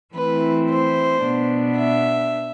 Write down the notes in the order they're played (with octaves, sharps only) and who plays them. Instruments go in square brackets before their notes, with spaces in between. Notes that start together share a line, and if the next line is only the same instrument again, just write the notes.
[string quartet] E3 A3 C4 E4 B4
C5
B2 B3 D4
E5